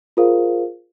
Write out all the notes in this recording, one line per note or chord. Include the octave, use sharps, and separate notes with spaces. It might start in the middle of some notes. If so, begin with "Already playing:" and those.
F4 G#4 A#4 C5 F5